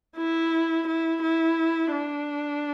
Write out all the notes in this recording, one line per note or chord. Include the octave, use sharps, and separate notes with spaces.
E4
E4
E4
D4